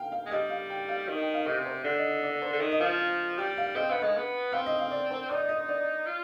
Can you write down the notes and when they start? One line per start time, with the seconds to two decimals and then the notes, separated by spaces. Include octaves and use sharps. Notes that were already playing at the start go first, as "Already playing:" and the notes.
Already playing: F5 G5
0.12 F5
0.26 G#3
0.31 G3 D#5
0.50 F5
0.70 G5
0.88 F5
1.08 D#3 D#5
1.21 G5
1.34 F5
1.46 C3 D#5
1.66 C5
1.84 D3 D5
1.98 D#5
2.10 D#5
2.23 D5
2.42 C5
2.53 D3
2.61 D#3
2.72 D#5
2.80 F3 F5
3.38 G3 G5
3.57 F5
3.76 C4 D#5
3.89 B3 F5
4.02 G#3 D#5
4.17 B3
4.52 C4 F5
4.66 D#5
4.79 F5
4.91 D5
5.10 C5
5.29 D#4 D5
5.49 D#5
5.69 D5
6.06 F4